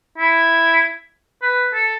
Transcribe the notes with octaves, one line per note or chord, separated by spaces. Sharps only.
E4
B4
A4